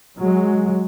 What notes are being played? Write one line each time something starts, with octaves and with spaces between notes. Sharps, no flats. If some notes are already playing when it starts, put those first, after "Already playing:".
F#3 G#3